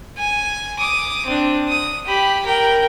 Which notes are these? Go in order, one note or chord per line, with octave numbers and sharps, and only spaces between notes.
G#5
D6 D#6
C4 D4
D#6
G4 B5
A#4 G5